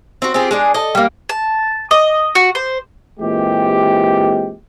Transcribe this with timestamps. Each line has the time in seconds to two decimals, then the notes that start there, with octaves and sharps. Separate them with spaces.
0.22 C4 F#4
0.34 C4 F4 G4 G#4
0.51 G#3 D4 G#4
0.74 A4 D#5
0.95 G3 A#3
1.29 A5
1.91 D#5
2.35 F#4
2.55 C5
3.20 A#2 E3 G#3 C4 G4